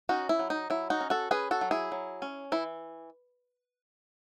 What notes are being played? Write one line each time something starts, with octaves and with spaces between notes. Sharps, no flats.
C#4 D#4 F#4
E4
F#3
D#4
F#3 E4
D#4 F#4
C#4
F#4 A4
C#4 G#4 B4
F#4 A4
F#3
E4 G#4
F#3
C#4
E3 E4